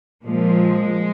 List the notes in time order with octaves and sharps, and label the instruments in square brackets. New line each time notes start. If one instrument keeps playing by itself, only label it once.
[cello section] A#2 F3 G#3